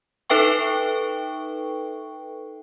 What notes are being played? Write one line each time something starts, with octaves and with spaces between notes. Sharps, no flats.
D#4 A4 B4 E5 G5 C#6